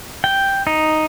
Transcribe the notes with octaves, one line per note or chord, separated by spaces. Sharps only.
G5
D#4